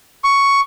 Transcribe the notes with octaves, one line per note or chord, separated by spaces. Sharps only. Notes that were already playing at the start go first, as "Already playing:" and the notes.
C#6